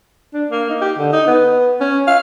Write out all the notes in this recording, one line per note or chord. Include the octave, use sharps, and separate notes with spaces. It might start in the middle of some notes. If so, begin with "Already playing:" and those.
D4
A#3
D#4
G4
D3
D#4
B3
C#4
F5